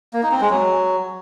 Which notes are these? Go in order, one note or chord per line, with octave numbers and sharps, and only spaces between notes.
A#3
D#4
C4
G#3
F#3